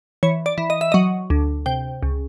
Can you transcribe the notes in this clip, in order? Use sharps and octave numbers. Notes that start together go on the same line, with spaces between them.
E3 C#5
D5
E3
D#5
E5
F#3 D#5
D2
C3 G5
C#2